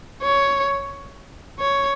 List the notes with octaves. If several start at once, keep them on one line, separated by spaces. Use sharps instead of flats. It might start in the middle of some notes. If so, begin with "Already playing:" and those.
C#5
C#5